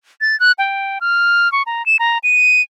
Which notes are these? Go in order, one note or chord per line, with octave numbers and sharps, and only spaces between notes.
A6
F#6
G5
F6
C#6
A#5
E7
A#5
D#7